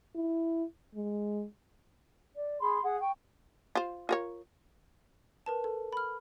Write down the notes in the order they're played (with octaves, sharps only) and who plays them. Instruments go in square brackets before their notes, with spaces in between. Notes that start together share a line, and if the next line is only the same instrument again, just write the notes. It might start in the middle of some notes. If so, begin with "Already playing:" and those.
[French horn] E4
G#3
[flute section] D5
G#4 B5 C6
G#4 F#5
G5 C#6
[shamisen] F4 C5
F4 A#4 C#5
[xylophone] A#4 B4 A5
A4
B5 F6